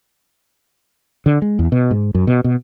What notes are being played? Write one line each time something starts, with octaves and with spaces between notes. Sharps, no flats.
D3
G#3
E2
B2
G#2
F#2
B2
B2